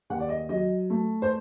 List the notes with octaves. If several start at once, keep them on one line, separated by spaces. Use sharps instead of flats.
D#2 F#5
D5
D#5
F#3 D#5
A3
C5